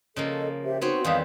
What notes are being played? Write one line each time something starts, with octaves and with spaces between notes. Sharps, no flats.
C#3 F3 A#3 A4 D#5
G4 C5 E5
B3 C4 D#4 F#4 C5 C#5
E2 D#3 G3 D#5 F5 D#6